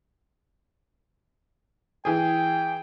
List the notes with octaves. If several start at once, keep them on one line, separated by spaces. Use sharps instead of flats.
E3 G#4 G5